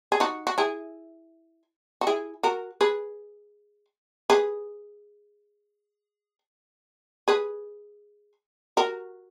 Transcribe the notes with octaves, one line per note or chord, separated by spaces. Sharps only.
G#4
D#4 F#4
F#4
E4 G#4
F#4
E4 G#4
F#4 A#4
G#4 B4
G#4 B4
G#4 B4
F#4 A#4